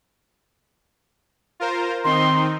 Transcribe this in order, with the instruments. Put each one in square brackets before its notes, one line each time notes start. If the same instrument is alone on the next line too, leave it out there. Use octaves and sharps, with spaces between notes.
[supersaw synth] F4 A#4 C5
[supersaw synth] D#3 C4 D#4 [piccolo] C6